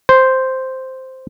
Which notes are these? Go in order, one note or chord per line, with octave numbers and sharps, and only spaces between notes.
C5